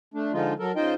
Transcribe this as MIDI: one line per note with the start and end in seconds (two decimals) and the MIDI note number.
0.14 0.32 57
0.14 0.32 62
0.33 0.54 50
0.33 0.54 53
0.33 0.54 56
0.33 0.54 63
0.33 0.54 65
0.59 0.72 54
0.59 0.72 69
0.59 0.72 70
0.76 0.95 49
0.76 0.95 63
0.76 0.95 65
0.76 0.95 72
0.76 0.95 75
0.76 0.95 79